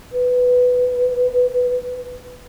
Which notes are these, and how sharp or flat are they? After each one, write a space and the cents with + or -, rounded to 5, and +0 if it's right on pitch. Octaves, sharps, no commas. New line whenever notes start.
B4 +5